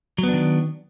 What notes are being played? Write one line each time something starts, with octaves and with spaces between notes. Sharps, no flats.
D#3 F#3 B3 D4